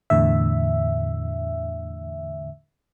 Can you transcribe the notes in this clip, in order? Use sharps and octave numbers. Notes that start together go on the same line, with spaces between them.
E2 A2 D3 E5